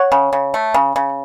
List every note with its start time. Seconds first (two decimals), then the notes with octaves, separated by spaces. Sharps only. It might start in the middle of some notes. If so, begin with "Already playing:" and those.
Already playing: C#5 F#5
0.12 C#3
0.33 C#3
0.54 A3
0.74 C#3
0.96 C#3